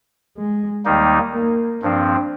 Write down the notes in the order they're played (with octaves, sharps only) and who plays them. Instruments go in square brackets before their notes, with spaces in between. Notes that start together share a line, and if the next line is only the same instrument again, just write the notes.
[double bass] G#3
[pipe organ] D#2 D#3 G3 A#3 D#4
[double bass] A#3
[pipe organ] G2 F3 C4 [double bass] D4